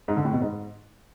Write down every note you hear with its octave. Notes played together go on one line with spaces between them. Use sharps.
G#2
D3
A2
B2
G#2